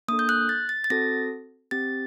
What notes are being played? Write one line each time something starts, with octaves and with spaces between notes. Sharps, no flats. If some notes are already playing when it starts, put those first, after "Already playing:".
A#3 D4 A4 D#6
G6
F#6
A6
A6
A6
C4 F#4 A4 A#6
C4 G4 A6